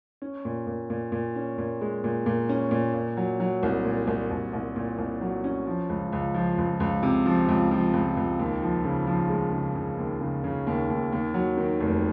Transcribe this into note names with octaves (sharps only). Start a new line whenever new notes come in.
C#4
A#2
A#2
A#2
A#2
C#4
A#2
G#3
A#2
A#2
C#4
A#2
A#2
F#3
F#3
C2
A#2
C2
C2
C2
A#2
C2
F#3
C#4
F3
C#2
C#2
F3
C#2
C#2
C3
F3
C#2
F3
C#2
C#2
D#2
F3
C#3
F3
G#3
C#3
C#3
D#2
C#3
C#3
D#2
D#2
D#2
F#3
D#3
F1